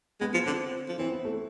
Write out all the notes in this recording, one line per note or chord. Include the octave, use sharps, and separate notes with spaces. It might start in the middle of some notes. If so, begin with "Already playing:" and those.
G#3 B3
F3 B3
D3 C4
F3
E3 C4
B3
A3